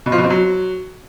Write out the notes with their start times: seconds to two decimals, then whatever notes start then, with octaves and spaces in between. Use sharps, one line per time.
0.06 B2
0.12 F3
0.18 B2
0.24 C4
0.30 F#3